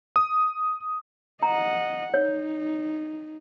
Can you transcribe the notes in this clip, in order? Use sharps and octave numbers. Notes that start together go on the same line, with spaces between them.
D#6
D#5 F#5 A#5
D#4 C#5